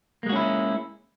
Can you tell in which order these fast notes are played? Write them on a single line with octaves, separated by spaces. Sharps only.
A#3 G#3 F#4 C#4 E4